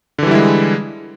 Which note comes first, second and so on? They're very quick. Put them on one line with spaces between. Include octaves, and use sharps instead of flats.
D3 E3 G3 E4 G#3